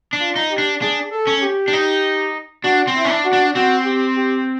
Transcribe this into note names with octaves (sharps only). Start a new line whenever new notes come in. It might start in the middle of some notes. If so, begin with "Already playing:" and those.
D4
F4
D#4
G4
D4
D4 G#4
A4
C#4
G4
D4
D#4
D4 F#4
C4
E4
C#4
D4
F#4
D4
C4 F#4
G4
G4